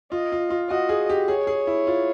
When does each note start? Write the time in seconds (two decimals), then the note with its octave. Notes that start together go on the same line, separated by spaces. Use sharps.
0.12 F4 D#5
0.32 F4
0.50 F4
0.70 F#4 D#5
0.89 G#4
1.10 G4
1.28 G#4 C#5
1.47 G#4
1.67 E4
1.87 F4